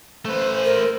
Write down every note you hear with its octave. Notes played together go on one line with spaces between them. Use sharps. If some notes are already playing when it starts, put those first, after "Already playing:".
A3 B4 C5
A#4